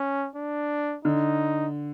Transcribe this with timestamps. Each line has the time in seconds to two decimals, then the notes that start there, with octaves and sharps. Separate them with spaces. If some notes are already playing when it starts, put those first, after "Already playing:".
Already playing: C#4
0.36 D4
1.05 D3 D#4